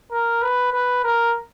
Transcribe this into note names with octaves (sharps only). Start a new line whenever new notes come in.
A#4
B4
B4
A#4